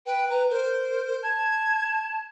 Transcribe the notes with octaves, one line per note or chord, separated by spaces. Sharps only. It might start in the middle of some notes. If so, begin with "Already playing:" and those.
B4 G5
B4 A#5
A#4 C5
A5 G#6